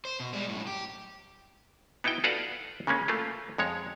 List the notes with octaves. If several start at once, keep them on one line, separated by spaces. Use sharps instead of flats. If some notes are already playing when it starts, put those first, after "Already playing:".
C5
B2
G3 G#3
F#2 A2
G4
B3 D#4 E4 F#4 G5
F4 F#4 A4 B4 D5 F5
C#3 G#3 A#3 C#4
A3 A#3 F4
F2 G#3 C#5